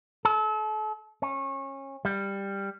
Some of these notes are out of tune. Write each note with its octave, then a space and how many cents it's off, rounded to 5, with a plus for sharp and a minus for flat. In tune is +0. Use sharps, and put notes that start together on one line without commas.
A4 -35
C#4 -25
G3 +10